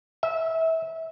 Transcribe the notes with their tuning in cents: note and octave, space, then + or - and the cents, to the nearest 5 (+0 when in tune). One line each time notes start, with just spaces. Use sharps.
E5 -25